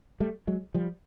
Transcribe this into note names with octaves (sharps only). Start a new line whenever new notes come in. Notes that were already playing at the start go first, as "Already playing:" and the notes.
G3 A3
F#3 G#3
F3 G3